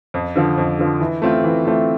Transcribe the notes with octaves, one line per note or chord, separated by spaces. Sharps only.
F2
D3 F3
F2
D3 F3
E3
A3 C4 F4
E3
A3 C4 F4